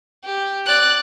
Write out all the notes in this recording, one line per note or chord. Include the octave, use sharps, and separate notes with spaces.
G4
D5 F#6